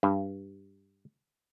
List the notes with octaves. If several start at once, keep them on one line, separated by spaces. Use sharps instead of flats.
G2